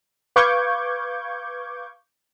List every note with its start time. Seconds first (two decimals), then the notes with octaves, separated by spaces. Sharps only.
0.36 B4 F5 C#6 D6 G6 G#6